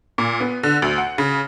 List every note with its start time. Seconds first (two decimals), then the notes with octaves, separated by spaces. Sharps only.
0.18 A#2
0.40 B3
0.63 D3
0.82 D2
0.98 F#5
1.18 C#3